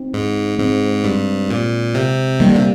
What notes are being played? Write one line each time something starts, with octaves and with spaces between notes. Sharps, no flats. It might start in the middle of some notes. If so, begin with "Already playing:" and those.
Already playing: C4 D#4
G#2
G#2 G#3 C4
G2
A#2
C3
D#3 G3 A#3
D3
C3